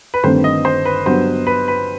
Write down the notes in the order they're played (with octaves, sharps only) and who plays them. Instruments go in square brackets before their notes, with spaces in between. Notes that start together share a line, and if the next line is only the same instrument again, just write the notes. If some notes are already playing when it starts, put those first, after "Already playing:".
[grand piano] B4
[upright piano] G1 G2 D#3 A3 C4 [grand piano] C5
[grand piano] D#5
C5
B4
[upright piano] G2 F#3 B3 [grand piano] C5
[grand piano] B4
B4